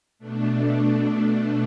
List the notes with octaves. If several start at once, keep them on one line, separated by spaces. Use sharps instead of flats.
B2 A3 D4